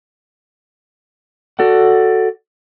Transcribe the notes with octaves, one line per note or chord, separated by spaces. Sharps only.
F#4 A4 D5 F#5